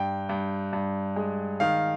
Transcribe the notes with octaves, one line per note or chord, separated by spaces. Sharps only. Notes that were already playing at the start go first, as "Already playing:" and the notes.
Already playing: G2 G5
G2
G2
G#3
D#3 F5